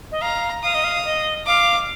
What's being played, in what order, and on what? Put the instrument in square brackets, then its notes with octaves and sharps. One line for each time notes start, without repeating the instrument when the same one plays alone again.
[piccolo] D#5
[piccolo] F5 [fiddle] A#5
[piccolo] F5 [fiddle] D#6
[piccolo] D#5
F5
D#5
[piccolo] F5 [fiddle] D6